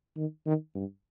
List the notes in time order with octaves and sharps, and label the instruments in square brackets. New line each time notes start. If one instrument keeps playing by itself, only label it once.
[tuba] D#3
D#3
G2